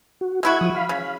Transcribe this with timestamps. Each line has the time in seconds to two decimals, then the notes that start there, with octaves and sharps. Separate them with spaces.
0.21 F#4
0.43 G#3 E4 F#4 E5 G#6
0.61 F3 D#6
0.75 F5 B5
0.89 C#3